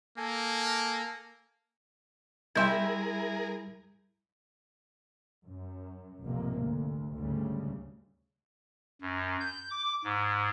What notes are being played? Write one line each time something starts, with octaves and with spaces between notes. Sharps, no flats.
A#3 A4 G#5
G3 E4 G#4 A#4 E5 G5 C6 G6
F#2
F1 B1 F2 G#2 C3 A#3
D2
D2 G#2 C#3 G3
F#2
G6
D6
G#2